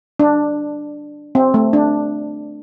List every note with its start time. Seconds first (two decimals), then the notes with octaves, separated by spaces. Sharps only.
0.19 D4
1.35 C4
1.54 A3
1.73 D4